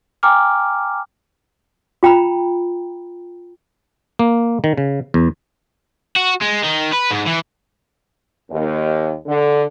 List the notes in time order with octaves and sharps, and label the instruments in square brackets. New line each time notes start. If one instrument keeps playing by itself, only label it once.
[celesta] G5 G#5 A#5 D6 F6
[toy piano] F4 G5 A#5 B5
[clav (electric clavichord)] A#3
D#3
C#3
E2
[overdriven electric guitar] F#4
G#3
D#3
B4
G#2
E3
[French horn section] D#2
D3